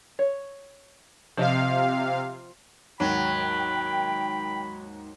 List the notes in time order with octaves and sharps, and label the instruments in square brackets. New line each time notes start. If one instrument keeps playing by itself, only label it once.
[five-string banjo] C#5
[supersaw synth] C3 F5 [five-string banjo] F3 F4 D#5
[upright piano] D#2 G#2 [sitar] F#3 [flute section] G5 [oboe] B5